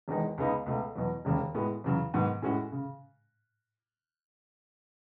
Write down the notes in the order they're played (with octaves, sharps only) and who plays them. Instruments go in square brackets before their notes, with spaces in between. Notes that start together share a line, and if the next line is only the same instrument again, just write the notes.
[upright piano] E1 E2 D#3 G#3 D#4
C#2 C#3 G#3 B3 D#4
C#2 B2 A3
E2 B2 F#3
E1 D#2 C#3 G#3
A2 G#3 B3 F#4
E2 C#3 F#3
G#2 D#3 F#3 B3 F#4
A2 G#3 C#4 F#4
C#3